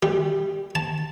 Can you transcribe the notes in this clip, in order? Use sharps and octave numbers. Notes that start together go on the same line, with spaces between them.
G3
A5